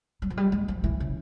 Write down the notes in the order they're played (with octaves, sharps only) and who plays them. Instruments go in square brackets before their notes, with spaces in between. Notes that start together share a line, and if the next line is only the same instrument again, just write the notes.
[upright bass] G3
F3
G3
G#3
F3
E3
C#3